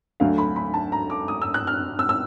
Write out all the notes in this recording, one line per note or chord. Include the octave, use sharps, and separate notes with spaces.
D2 D3 F#3 A3 F5
B5
B5
A5
A#5
D6
D#6
E6
F#6
F6
E6
E6